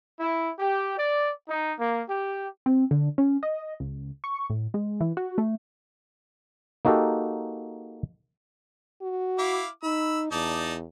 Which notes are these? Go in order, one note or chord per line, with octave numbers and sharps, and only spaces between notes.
E4
G4
D5
D#4
A#3
G4
C4
D3
C#4
D#5
C#2
C#6
A2
G#3
E3
F#4
A3
A#3 D#4 F#4 G4 A4
F#4
E4 F5 D6
D#4 B5 E6
E2 D#4 D5 A5